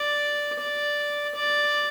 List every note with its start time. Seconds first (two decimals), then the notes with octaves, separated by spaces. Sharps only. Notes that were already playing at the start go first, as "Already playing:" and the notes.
Already playing: D5
0.60 D5
1.35 D5